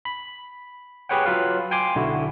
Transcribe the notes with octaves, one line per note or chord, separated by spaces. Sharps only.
B5
G4 G#4 B4 C#5 F#5 G5
F#3 F4 B4 F5
G5 G#5 C6 D6
B1 D3 E4 F#4